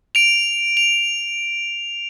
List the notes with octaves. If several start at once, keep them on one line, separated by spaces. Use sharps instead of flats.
D7 F7
F7